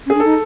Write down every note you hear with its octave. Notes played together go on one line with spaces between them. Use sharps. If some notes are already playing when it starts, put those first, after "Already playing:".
C#4 G#4
D4
D#4 A4